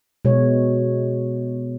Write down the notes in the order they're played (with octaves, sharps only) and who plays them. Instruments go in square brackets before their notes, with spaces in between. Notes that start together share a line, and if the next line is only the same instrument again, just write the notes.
[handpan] B2 G#3 C#5